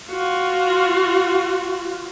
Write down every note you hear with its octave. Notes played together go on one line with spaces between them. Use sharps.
F4 F#4